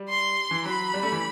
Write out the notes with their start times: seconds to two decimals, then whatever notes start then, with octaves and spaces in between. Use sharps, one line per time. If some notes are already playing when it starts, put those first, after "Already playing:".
Already playing: G3
0.09 C6
0.51 E3
0.65 F#3 B5
0.94 G3
1.03 A3
1.12 E3